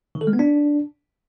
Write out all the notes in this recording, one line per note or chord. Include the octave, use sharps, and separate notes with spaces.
D#3
A4
G#3
B3
D4